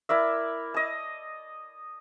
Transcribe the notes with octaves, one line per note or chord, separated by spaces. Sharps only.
E4 A#4 D5 E5
D#5 A5